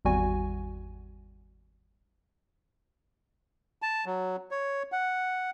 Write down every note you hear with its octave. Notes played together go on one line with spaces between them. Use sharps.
G#1 E2 G3 F#4 G#5
A5
F#3
C#5
F#5